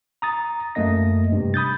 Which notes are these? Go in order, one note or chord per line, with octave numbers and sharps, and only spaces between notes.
A#5 D#6 A6
F#2 A3 A#3 D#5 A#6
G2 C3
B5 D#6 G6 A6